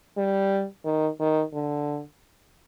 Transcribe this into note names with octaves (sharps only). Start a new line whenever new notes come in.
G3
D#3
D#3
D3